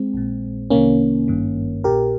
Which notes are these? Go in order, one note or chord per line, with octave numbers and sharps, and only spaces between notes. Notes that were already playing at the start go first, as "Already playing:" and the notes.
Already playing: G#3 C4
A#1 A#2
C2 C3 D#3 A#3 C#4
G#1 G2 D#3
A#1 A#2 G4 A#4